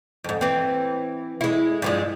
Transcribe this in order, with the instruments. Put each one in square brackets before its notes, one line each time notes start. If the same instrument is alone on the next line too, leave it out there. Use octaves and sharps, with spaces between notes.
[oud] F2 G#2
E3 C4
G#3 E4
G2 F3 G#3